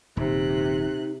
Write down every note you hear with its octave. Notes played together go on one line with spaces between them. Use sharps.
D#1 C3 D#4 F#6